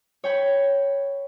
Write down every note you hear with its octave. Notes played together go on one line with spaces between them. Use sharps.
C#5 G5 B5